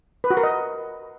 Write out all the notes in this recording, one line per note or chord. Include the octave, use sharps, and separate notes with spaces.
B4
F#4
A#4
D#5